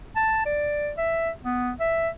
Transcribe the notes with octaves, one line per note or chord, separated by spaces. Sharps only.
A5
D5
E5
B3
E5